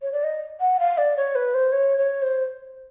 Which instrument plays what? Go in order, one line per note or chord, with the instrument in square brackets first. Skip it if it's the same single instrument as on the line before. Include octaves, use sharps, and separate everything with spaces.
[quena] C#5
D5
D#5
F#5
F5
D5
C#5
B4
C5
C#5
C#5
C5